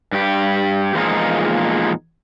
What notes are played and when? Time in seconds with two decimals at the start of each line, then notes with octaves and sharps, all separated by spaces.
0.12 G2 G4
0.95 E2 A#2 F3 G#3 A#3 D#4